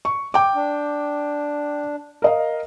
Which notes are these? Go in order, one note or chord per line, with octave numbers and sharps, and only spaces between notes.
C#6
G5 D6
D4
A#4 D#5 F5